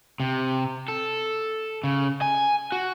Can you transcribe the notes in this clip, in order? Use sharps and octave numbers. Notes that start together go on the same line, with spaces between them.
C3
A4
C#3
G#5
F#4